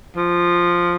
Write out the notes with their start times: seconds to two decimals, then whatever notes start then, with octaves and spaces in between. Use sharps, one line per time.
0.16 F3